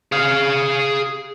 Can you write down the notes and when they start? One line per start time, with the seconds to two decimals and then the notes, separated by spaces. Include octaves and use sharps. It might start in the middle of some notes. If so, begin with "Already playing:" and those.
0.12 G#4 F5